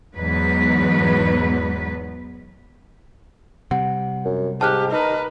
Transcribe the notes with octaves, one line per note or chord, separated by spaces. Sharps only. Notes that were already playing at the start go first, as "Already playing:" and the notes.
E2 G#2 F#3 B3 B4
C3 G3 F#5
F#2
G#2 G4 A5 F6 F#6
D#4 A#4 B4